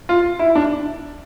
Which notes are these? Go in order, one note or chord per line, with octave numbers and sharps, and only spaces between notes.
F4
E4
D4